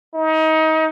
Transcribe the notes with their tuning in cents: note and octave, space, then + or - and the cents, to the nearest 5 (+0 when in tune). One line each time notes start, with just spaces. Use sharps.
D#4 +25